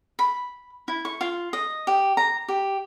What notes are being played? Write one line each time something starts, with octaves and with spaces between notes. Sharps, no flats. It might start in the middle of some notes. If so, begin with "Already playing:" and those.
B5
E4
C#6
F4
D#5
G4
A#5
G4